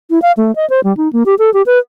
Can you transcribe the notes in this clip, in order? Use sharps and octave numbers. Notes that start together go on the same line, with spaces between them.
E4
F5
A3
D#5
C5
G3
D#4
A#3
G4
A4
G4
B4